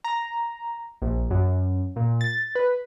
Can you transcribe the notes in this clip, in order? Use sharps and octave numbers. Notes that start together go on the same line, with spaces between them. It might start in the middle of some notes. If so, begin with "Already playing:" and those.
A#5
A#1
F#2
A#2
A6
B4